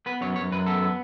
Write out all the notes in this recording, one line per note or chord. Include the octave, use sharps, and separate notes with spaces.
B3 B4
F#2 C#5
F#2 C#5
F#2 B4
B3 A4
B3